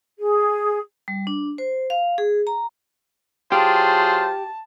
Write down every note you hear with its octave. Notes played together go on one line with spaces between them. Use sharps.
G#4
G3
D4
C5
F5
G#4
A#5
F#3 F4 G4 G#4 C5 A5